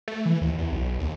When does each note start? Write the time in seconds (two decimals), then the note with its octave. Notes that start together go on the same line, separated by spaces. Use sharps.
0.08 A3
0.26 E3
0.41 D#2
0.58 E2
0.72 B1
0.99 D#2